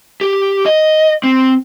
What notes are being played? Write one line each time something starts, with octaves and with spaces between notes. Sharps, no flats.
G4
D#5
C4